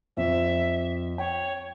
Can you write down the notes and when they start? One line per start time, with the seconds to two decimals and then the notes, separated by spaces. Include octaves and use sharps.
0.17 F2 E5
1.18 C#5 G5